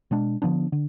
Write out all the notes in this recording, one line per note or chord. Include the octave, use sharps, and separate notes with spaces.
B2 G#3 D4
D3 F3 B3 D4
D3